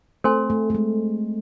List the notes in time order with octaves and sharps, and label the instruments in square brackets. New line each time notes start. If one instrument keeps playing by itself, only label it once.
[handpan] A3 C4 [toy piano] A4 C5 G#5 C6
[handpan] A3
A3
G#3